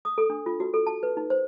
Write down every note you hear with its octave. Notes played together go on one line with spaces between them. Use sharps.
D#6
A4
D4
F4
F#4
A4
A5
B4
D#4
C5